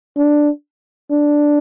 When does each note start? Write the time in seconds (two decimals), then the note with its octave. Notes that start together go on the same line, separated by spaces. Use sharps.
0.17 D4
1.11 D4